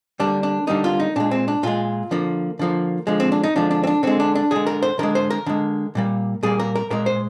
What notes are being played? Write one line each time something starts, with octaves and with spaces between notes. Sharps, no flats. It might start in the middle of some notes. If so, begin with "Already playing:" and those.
D3 G3 A#3 D4
D4
D3 G3 A#3 D#4
F4
D#4
A#2 G#3 D4
C4
D4
A#2 G#3 F4
D3 F3 A#3
D3 F3 A#3
D3 F3 G#3
C4
D4
D#4
D3 F3 G#3 D4
D4
C4
D4
D3 G#3 C4
D4
D4
D3 G#3 G#4
A#4
C5
D3 G#3 A#4
C5
A#4
D3 G#3
A#2 G3 A#3
A#2 G3 A#3 G#4
A#4
A#4
A#2 G#3 A#4
C5